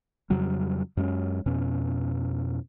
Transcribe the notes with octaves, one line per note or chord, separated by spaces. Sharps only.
F2 C#3 F#3 G3
F#2 G#3 C4 C#4
F2 B2 C#4